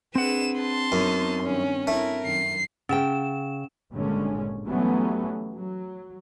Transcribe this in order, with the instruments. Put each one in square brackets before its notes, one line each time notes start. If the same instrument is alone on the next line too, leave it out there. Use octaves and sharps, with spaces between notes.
[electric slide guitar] C4 F#5 [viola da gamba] D4 G#4 B4 [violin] E7
[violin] A5 C6
[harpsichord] F#2 [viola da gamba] B3 C#4 D#4
[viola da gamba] G2 D#3 [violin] C#4
[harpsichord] A3 [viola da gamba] E4 A#4
[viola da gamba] F#2 D#3 [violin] C7
[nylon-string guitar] C#3 G5 [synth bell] C#4 E7
[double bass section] G#1 G2 A#2 D3 G#3 C#4
E3 F#3 G3 A3 B3 C#4
F#3